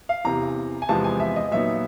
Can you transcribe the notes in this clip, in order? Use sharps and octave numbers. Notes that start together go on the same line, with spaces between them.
F5
E2 C3 E3 A#5
G#5
E2 C3 F3 G#3 B3 A5
G#5
E5
D#5
A#2 F#3 B3 D#4 E5